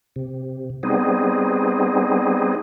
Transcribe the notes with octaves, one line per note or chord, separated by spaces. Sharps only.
C3
G3 B3 C4 D#4 G#4